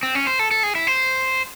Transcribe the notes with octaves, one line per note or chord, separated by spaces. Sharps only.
C4
C#4
C5
A4
A4
G#4
E4
C5